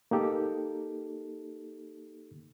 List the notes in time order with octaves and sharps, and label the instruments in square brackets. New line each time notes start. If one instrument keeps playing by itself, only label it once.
[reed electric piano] A#3 D#4 G4 A4